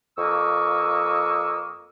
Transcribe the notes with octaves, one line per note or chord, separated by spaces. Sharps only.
F2 A#3 C#6 D#6 E6